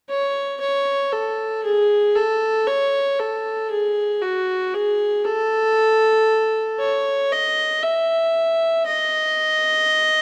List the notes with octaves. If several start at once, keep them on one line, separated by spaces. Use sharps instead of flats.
C#5
C#5
A4
G#4
A4
C#5
A4
G#4
F#4
G#4
A4
C#5
D#5
E5
D#5